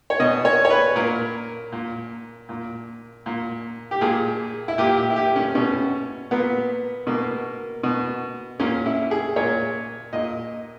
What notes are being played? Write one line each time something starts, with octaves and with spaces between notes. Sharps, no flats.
C#5
B2 D#5
C#5
C#5
B4
A#2 A#4
A#2
A#2
A#2
G4
A#2 G#4
E4
A#2 G4
G4
E4
G4
C#4
B2 C#4
A#2 B3
B2 A#3
B2
A#2 C#4
E4
G#4
A#2 C#5
A#2 D#5